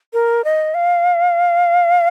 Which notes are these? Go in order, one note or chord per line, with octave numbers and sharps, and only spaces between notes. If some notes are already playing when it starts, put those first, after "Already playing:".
A#4
D#5
F5